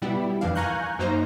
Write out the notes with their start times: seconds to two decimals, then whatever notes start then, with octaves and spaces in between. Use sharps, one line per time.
0.02 B2 G3 B3 E4
0.41 F2 D#3 E3 D4 F5
0.55 F5 G#5 A#5 C#6 F#6 G6
0.99 F#2 A#3 D#4 C5 A#5